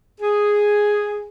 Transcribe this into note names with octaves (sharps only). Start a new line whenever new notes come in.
G#4